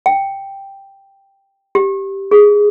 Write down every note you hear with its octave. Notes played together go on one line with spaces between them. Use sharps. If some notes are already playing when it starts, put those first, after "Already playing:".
G5
G4
G#4